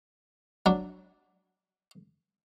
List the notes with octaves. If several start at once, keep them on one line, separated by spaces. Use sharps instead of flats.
F#3 D4